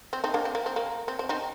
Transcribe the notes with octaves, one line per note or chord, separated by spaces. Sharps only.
C4
C4 D#4
A#3 D4
C4
A#3
C4
A#3
C4
C4
C4 D#4